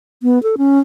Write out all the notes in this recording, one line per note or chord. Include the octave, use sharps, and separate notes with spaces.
B3
A4
C#4